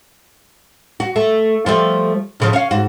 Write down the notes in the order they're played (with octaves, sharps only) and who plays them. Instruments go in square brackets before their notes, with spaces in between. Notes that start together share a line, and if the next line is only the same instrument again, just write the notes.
[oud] F#4
A3
F3 G3 A3
A2 C#3 F3
C#4 F5
G#2 F#4